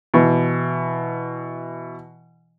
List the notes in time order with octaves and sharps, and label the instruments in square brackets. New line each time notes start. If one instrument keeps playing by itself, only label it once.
[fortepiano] B2 E3